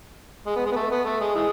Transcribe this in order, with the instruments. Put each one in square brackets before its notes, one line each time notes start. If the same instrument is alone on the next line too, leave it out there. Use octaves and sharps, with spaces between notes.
[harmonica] G#3
B3
G#3
B3
A3
B3
A3
G#3
E3 G#3